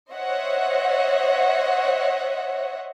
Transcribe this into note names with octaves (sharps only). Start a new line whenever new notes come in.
C5 C#5 D#5 E5 F#5